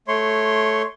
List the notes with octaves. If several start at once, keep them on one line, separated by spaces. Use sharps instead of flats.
A3 C#5 C6